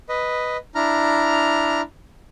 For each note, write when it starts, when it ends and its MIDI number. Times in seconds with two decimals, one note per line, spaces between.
0.09 0.57 71
0.09 0.57 75
0.75 1.81 62
0.75 1.81 64
0.75 1.81 82
0.75 1.81 89